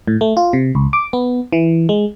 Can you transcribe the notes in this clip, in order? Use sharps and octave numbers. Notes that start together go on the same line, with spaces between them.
A2
A3
F4
C3
C#2
D6
B3
E3
G#3